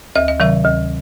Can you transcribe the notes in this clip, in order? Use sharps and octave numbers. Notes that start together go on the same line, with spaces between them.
D2 E5
D#5
C3 D#3 F#3 E5
D2